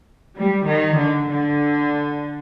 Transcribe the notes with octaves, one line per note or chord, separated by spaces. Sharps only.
G3
D#3
D3
D3